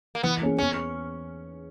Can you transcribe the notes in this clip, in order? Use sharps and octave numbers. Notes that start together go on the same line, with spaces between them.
A#3
E3 B3
A#3 C#4 G#4
E2 C#4